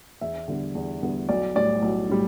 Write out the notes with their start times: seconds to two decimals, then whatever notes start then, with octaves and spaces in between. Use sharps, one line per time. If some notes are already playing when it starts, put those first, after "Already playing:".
0.21 E2 E5
0.48 D3 G3 B3
0.75 E2
1.02 D3 G3 B3
1.29 B1 D5
1.55 A2 G3 D5
1.82 B1
2.09 A2 G3